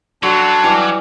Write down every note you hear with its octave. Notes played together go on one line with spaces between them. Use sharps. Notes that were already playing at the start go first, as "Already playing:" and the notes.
F#3 D4 F#4 A4 C6
E3 G3